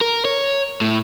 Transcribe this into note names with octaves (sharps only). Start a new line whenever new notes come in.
A#4
C#5
A2